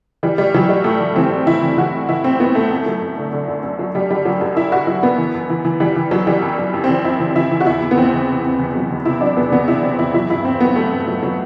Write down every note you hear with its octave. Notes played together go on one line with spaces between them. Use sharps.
E3 G3
A2 G3
E3 F#3
A2 G3
A2 A3
E3
E3 C4
A2
E3 E4
E3
E3 F#4
A2
E3 E4
A2 C4
A2 B3
A2 A3
F#2
F#3
F#2
D3
D3
F#2
F#2
F#3
F#3 G3
D3 G3
F#2 F#3
F#2 G3
F#2 E4
F#2 F#4
F#3 E4
F#2 B3
E3
F#2
E3
E3
E3 G3
E3
F#2 F#3
E3 G3
F#2
F#2
F#2
C4
E3
F#2 E4
E3
E3 E4
E3
F#4
E2 E4
E2
B3
E2 C4
E2
C3
E2
E2
F#3
E2
C3 E4
F#3 D4
E2 B3
E2 B3
C3 E4
C3 C4
E2 E4
F#3 E4
G2 E4
G2 C4
F#3 B3
F#3 A3
G2
F#3
F#3